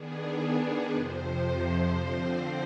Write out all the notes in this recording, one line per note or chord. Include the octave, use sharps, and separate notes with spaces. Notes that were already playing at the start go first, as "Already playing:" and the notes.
Already playing: D#3 B3 D4 G#4
F2 C3 F3 C5
D3 F3 C4